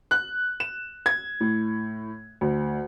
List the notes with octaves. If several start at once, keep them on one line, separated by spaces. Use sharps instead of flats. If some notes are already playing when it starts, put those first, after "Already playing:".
F#6
E7
G#6
A2
D2